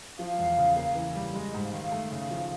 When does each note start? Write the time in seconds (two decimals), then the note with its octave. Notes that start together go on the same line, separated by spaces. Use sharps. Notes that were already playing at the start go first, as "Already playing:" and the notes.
0.19 F3 F5
0.39 E2
0.58 C#3
0.76 A#3
0.95 E3
1.15 G3
1.34 G#3 D#5
1.54 G#2
1.63 F5
1.73 D#3
1.92 A3
2.11 C#3
2.31 F3